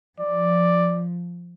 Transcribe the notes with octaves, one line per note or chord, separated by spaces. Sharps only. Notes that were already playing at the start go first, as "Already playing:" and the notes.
F3 D5